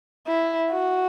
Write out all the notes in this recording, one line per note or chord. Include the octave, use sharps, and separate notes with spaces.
E4
F#4